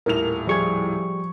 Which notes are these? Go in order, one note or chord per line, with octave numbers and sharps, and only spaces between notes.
D#1 A2 A#4 F7
F3 G3 G#4 C#6 G#6